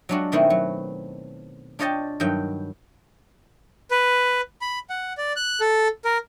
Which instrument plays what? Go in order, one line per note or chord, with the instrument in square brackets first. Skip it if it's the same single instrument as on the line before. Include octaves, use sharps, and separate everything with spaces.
[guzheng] F#3 G#3 D4 F4 F#4
B2 D#3 A3 C4 D#4 E4
F#3
D4 F4 C#5 D#5 G5 A5
G2 D#3 F#3 G5
[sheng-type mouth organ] B4
B5
F#5
D5
F#6
A4
A#4